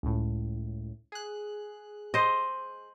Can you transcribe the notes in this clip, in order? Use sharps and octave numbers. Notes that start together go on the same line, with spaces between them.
C#2 A2
G#4 F#6
C5 D#5